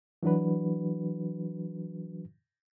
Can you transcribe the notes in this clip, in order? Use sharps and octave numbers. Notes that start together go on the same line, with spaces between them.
E3 F#3 D4 F#4 B4